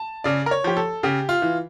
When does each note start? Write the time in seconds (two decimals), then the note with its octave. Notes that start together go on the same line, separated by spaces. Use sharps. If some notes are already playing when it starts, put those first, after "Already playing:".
Already playing: A5
0.24 C#3 D5
0.46 A#4
0.51 C#5
0.64 F3 G4
0.77 A4
1.03 C#3 G4
1.29 F4
1.42 E3